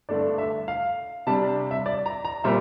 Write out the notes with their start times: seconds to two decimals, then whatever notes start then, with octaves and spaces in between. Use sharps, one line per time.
0.09 G2 D3 A3 D4 D5
0.38 E5
0.68 F5
1.27 C3 G3 D4 A5
1.71 E5
1.86 D5
2.06 A#5
2.25 A#5
2.44 A#2 G3 C4 E5